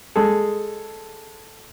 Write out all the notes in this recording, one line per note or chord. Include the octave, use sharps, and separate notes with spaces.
G#3 G#4 A4